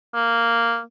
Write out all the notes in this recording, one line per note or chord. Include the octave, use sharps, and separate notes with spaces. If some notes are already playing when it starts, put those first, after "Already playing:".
A#3